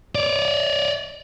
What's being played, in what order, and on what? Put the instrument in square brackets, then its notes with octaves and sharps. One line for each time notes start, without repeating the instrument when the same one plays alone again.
[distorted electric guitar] C#5 D5